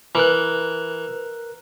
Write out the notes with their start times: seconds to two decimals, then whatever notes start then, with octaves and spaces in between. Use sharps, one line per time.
0.15 E3 A#4 F#6